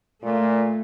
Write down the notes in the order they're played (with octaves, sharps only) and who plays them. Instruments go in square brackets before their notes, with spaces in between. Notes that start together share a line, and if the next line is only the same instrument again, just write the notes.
[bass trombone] A#2 [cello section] A3